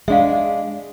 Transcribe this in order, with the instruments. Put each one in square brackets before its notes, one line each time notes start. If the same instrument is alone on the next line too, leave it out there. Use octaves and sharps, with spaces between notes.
[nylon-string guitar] G#3 D4 [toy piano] E5 F5